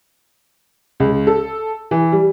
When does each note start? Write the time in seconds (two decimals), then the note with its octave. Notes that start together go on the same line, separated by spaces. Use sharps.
1.00 C#2
1.27 A4
1.91 E3
2.12 G3